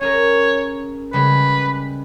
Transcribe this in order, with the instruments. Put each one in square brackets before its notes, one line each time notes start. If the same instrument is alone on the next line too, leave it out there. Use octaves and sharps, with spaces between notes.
[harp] C#4 G#4 A#4 [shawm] C#5
[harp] C#3 G3 G#3 [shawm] B4